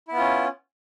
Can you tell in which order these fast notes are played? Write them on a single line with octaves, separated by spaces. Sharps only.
E4 B3 F4 C#4